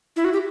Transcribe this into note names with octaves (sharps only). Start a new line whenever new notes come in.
E4
F#4
G4